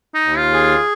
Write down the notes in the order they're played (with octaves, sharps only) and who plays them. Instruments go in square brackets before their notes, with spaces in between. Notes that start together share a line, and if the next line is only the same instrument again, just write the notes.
[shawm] D#4
[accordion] D#2
[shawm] F4
[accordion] G#4